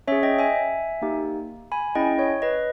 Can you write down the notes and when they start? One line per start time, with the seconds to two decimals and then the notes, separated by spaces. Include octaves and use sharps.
0.08 C#4 G#4 C#5 E5
0.23 D#5 G5
0.39 E5 G#5
1.02 A#3 D#4 G4
1.72 G#5 B5
1.95 C#4 E4 G#4 D#5 G5
2.19 C#5
2.42 B4 D#5